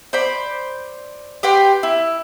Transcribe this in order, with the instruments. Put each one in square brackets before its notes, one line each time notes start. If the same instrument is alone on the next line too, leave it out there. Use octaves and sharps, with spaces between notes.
[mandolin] C5 D5 B5
G4 B4 G5 C6
E4